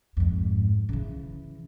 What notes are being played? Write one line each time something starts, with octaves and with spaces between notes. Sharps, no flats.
F2 G#2
C#3 E3